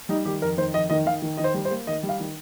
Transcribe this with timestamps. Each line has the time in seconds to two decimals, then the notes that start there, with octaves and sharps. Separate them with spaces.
0.09 G3 D#4
0.26 D#3 G4
0.41 F2 A#4
0.58 D#3 C5
0.74 F2 D#5
0.90 D#3 D#5
1.06 D#3 F5
1.22 D#3
1.37 D#3 D#5
1.44 C5
1.54 G3
1.65 C5
1.71 A#3
1.87 D#3 D#5
2.03 G3
2.09 F5
2.20 D#3